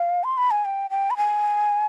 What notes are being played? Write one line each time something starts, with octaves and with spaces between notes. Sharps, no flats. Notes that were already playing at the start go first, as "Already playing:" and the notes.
Already playing: F5
C6
B5
G#5
G5
G5
B5
G#5